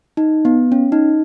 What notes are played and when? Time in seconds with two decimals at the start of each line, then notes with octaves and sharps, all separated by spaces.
0.17 D#4
0.45 B3
0.72 C#4
0.92 D#4